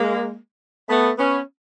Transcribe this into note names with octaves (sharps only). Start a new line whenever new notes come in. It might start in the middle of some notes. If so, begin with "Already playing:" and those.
Already playing: G#3 A#3
A3 B3
B3 C#4